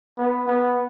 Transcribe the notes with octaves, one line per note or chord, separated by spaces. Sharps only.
B3
B3